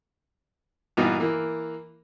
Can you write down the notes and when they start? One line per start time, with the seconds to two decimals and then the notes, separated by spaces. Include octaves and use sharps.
0.97 G2 A#2 E3 B3 D#4
1.20 E3 A#3